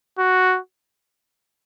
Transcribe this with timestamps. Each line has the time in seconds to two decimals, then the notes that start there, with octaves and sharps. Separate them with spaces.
0.18 F#4